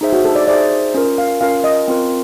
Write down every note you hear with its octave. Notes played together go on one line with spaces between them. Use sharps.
D#4 G#4 C5 E5
F#4
A4
D5
D#4 G#4 C5 D5 E5
C#4 F4 A#4
F5
C#4 F4 A#4 F5
D#5
C4 F4 A#4